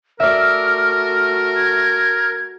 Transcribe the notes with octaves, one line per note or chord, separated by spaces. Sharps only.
A3 F#4 A#4 D5 E5 F6
G#6